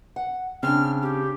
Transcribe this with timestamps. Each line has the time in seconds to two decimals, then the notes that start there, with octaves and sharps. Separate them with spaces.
0.16 F#5
0.63 C#3 C4 D4 F6
1.02 G4